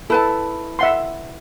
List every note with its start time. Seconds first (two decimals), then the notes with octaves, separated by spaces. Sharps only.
0.10 E4 A4 B4 A5
0.79 E5 F#5 C6